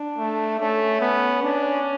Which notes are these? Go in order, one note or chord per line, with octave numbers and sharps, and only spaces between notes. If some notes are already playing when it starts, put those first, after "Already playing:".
Already playing: D4
A3
A3 C#4
B3
C#4 D4